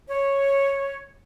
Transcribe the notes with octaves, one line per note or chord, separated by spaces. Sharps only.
C#5